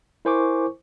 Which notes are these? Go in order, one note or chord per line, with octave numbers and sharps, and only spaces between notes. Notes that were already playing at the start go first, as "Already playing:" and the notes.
E4 A#4 C5 G#5 C#6 D6